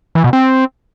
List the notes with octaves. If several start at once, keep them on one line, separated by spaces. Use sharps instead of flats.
E3
B2
C4